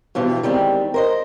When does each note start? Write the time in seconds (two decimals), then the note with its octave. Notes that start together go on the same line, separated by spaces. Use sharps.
0.15 G2 B2 E3 F3
0.43 D#3 G3 G#3 C4
0.94 A#4 C5 D#5